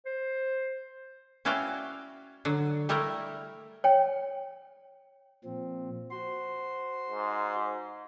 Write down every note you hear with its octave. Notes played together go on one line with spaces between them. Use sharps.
C5
C#4 E4 F#4 D5 F5 G5
D3 F#3
G3 A3 E4 A#4
C#5 G5
A#2 F3 C4
F#4 C5 C6
G#2